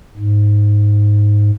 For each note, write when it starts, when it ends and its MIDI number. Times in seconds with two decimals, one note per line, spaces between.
0.17 1.51 44